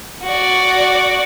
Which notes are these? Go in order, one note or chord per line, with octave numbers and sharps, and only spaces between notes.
F#4 D5